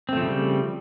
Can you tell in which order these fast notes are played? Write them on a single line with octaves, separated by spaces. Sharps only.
C4 A3 F3 C#3 G3